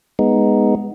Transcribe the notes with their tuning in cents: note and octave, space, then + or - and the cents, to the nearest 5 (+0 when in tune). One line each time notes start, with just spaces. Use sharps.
G#3 +0 B3 +0 D#4 +0